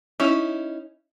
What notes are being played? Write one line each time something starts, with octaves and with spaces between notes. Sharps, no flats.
C#4 D#4 E4